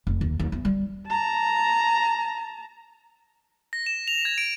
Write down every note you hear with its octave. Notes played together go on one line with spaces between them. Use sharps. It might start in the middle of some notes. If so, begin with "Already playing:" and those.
F1
D#2
D#2
E2
G3
A5 A#5
A#6
E7
F7
G#6
D7